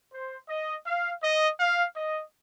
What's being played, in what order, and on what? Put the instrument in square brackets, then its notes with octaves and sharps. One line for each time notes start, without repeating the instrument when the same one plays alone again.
[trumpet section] C5
D#5
F5
D#5
F5
D#5